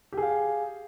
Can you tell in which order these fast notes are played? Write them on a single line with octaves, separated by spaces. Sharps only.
G4 G#4 F5